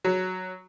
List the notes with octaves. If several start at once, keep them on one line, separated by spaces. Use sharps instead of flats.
F#3